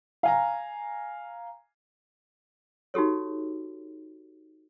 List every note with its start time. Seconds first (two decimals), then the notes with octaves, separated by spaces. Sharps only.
0.23 F5 G#5 A#5
2.94 D#4 F#4 G4 A4 C#5